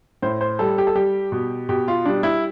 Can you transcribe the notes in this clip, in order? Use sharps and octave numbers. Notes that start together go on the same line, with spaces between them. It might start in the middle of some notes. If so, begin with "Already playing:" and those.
A2 C5
C5
G3 A4
G4
A4
G3 G4
B2
B2 G4
F4
G3 D4
E4